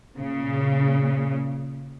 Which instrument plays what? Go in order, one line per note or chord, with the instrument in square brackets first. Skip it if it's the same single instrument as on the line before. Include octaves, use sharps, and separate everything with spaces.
[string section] A#2 C#3